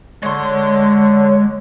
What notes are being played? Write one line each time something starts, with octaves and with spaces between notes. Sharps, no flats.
D3 G#3 C#5 C6